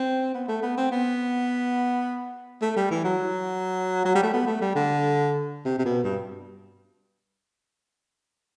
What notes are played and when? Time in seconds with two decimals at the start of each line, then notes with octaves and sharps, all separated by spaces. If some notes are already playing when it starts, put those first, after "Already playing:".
Already playing: C4
0.34 B3
0.48 A3
0.63 B3
0.78 C4
0.92 B3
2.62 A3
2.77 G3
2.91 E3
3.05 F#3
4.05 F#3
4.15 G3
4.23 A3
4.33 B3
4.47 A3
4.61 G3
4.76 D3
5.65 C3
5.79 C3
5.85 B2
6.04 G2